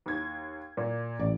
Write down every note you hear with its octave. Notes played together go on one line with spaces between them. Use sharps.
D#2 G#6
A#2
A1 D5